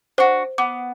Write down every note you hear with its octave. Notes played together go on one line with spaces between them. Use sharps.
D4 F#4 C5
B3 D6